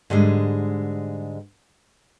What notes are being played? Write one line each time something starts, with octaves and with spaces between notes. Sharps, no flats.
G#2 D3 G3 G#3